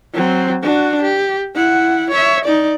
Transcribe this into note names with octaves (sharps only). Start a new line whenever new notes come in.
F#3 C4
D4 F#4
G4
E4 F#5
C#5 E5
D#4 D5